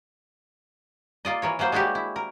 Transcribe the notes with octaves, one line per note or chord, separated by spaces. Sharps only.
A#3 F4 D5 D#5
E3 A#4 C#5
E3 F#3 A#3 C5
G#3 D4 E4 F#4 G4
E4
A#4